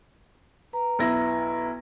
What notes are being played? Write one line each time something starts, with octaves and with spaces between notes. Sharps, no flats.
B4 A#5
B1 E4 A#6